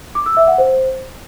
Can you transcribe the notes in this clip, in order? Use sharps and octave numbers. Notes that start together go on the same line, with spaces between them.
D6
E6
E5
F#5
C5